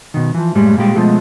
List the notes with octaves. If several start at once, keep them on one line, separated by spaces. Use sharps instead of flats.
B2 D#3
E3 F3
F#2 A2 G3 G#3
A#2 G3 G#3 G4
B2 F3 G#3 A3